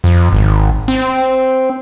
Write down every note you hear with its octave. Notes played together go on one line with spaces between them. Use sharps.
F2
G#1
C4